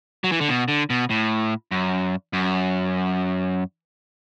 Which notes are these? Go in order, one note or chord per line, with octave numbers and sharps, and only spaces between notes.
F#3
E3
D3
B2
D3
B2
A2
F#2
F#2